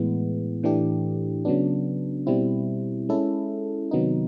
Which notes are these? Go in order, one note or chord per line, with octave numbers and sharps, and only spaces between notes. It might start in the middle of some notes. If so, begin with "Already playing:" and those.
Already playing: A2 E3 G#3 B3
A2 E3 A3 D4 G4
C#3 F#3 B3 D4
B2 G3 C4 E4
G#3 C#4 E4 A4
C3 D#3 F#3 B3 D#4